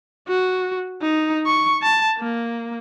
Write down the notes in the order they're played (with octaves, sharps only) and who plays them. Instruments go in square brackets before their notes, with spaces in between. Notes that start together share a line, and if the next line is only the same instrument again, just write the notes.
[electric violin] F#4
D#4
C#6
A5
A#3